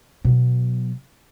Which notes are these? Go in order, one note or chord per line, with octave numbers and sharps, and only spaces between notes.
B2 F#3